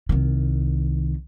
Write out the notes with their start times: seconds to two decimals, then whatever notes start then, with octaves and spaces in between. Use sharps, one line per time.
0.09 C2 D#3